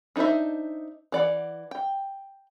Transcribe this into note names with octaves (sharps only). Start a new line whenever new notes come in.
D4 D#4 B4 C5 E5
E3 D5 F#5
G5